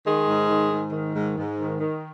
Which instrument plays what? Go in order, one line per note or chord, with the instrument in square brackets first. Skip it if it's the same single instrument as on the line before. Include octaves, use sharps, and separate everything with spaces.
[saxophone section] D#3 G#3
G#2
D#3
G#2
D#3
G#2
G#2
D#3
D#3